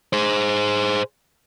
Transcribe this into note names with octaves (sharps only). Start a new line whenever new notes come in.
G#4 C5